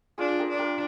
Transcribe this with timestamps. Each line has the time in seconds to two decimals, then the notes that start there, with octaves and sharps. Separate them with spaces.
0.18 D4 F4 G#4
0.39 G4 A#4
0.49 D4
0.59 G4 A#4